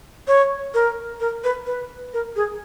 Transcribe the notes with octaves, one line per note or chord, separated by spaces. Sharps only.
C#5
A#4
A#4
B4
B4
A#4
G#4